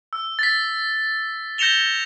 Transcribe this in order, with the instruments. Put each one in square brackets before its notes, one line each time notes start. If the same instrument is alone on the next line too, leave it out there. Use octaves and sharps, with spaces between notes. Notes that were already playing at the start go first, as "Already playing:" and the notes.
[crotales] E6
A6 B6
G6 A#6 C#7 E7 F7 G7